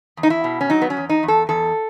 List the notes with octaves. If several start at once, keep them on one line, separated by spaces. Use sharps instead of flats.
E2
D#4
E4
B2
C#4
F#3 D#4
B3
C#4
E2
D#4
E2
A4
E2 A4